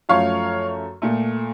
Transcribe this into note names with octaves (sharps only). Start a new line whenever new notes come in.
F#2 F3 A3 C#5 F5
A#2 A3